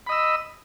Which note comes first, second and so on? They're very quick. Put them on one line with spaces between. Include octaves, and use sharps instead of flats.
B5 D#5 E6